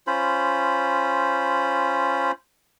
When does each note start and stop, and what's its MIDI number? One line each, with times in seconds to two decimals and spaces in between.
0.07 2.32 61
0.07 2.32 65
0.07 2.32 72
0.07 2.32 83